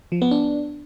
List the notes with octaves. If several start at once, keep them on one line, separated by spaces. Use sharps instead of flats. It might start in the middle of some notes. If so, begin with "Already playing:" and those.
F3
B3
D4